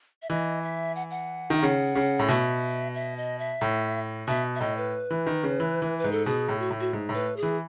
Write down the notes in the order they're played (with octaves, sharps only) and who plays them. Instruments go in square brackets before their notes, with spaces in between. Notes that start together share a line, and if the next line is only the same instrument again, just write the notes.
[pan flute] E5
[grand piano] E3 [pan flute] D#5
[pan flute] E5
F#5
F#5
[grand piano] D#3
[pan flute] E5
[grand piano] C#3 [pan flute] F#5
[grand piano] C#3
A2
[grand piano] B2 [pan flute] E5
[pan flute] E5
D#5
E5
[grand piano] A2
[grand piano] B2 [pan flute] E5
[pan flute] E5
[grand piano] A2 [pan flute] D#5
[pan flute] B4
[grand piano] E3
D#3
C#3
E3
E3
[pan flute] B4
[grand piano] G#2
[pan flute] A4
[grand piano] B2 [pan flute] G#4
[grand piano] A2
[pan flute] F#4
[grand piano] A2
[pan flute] F#4
[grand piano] G#2
A2
[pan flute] B4
G#4
[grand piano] E3